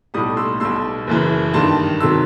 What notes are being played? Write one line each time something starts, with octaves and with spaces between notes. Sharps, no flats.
B1 A2 G3 B5 D#6
C6 E6
B1 B2 G3 C6 E6
F#1 F#2 E3
G2 D#3 G3 A5 C6
C3 D#3 F#3 C6 E6